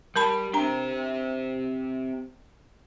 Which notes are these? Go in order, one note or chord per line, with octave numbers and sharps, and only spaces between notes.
G3 A#4 A5 B5
C4 D4 G4 A#5